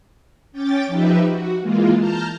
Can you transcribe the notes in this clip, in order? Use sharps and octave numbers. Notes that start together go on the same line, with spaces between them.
C#4 G5 D6 A6
F3 D#4 G4 B4 E5
F#4
E3 G#3 A#3 F4
A5 A#5 F6 G6